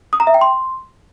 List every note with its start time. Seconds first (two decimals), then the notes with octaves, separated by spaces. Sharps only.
0.13 D#6
0.20 A#5
0.27 E5
0.34 G5
0.41 C6